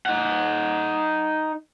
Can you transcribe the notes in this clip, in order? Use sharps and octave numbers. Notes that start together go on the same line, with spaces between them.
D#4 F#5